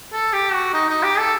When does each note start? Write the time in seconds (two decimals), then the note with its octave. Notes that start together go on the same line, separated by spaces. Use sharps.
0.13 A4
0.33 G4
0.53 F#4
0.73 D#4
0.89 D#4
1.03 G4
1.19 A4